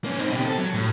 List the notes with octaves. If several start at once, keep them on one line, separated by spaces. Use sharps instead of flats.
A#3 C#4
C4 D#4
B2 G4
A4
F#3
A2